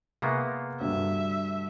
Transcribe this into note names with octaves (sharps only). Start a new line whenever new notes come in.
C3 G#3 A#3 B3 E5 C#6
D2 G2 E5